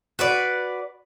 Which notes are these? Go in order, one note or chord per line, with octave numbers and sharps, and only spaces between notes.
F#4 B4 D5